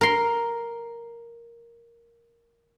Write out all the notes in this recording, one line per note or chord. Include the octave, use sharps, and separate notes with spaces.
A#4 C6